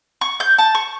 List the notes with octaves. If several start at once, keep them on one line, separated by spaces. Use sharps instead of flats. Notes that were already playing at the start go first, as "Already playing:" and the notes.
C#6
G6
A5
C#6